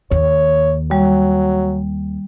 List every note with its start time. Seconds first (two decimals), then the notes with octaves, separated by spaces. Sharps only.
0.11 D#2 C#5
0.91 F#3 G3